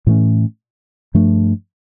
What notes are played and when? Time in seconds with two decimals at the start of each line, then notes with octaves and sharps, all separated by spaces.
0.07 A2 E3 A3 C#4
1.14 G2 F3 A3 D4